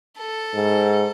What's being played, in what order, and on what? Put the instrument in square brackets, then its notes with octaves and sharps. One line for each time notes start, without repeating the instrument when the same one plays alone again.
[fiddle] A4
[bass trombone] G#2